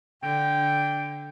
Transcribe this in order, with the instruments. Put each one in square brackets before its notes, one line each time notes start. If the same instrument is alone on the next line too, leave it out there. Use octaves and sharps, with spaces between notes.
[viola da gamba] D3 [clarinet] G5